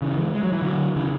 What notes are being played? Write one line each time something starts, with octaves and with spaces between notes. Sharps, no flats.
C#3 E3
E3 G#3
G#3
F#3
E3
D3 F#3
C#3 E3